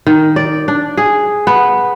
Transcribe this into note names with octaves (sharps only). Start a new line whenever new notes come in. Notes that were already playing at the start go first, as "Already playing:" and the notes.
D#3
D5
D4
G#4
B3